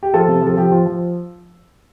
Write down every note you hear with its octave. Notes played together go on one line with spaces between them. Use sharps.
G4
F3 F4 A4
C3
F3 A4
F3 G4
F3 F4
F3